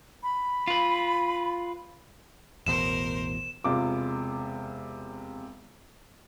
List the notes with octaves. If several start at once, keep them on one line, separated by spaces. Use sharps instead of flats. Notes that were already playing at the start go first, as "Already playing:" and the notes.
B5
F4 B4
A1 E2 B2 A#4 C5 E7
E1 C3 F4 D6